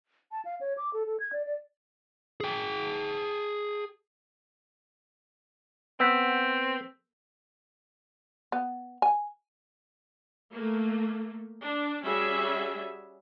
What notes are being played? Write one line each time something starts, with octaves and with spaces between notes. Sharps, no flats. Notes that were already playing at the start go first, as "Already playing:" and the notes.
A5
F5
C#5
D6
A4
A4
G#6
D5
D5
G#4 G5
B3 C4 E6 G6 B6
B3
G#5
A3 A#3
D4
G3 C#4 F#4 G#4 E5